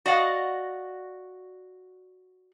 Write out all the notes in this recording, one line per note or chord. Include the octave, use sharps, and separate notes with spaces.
F#4 D5 D#5 F5 F#5